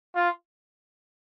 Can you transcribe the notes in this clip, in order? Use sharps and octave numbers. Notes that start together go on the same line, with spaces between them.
F4